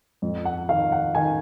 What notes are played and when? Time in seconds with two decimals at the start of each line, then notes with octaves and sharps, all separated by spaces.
0.22 F2
0.45 F#5
0.69 D#3 F5
0.92 F#5
1.15 D#3 G#5